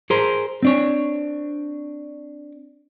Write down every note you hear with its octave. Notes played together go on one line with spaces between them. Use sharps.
G#4 A#4 C5
C4 D4 C#5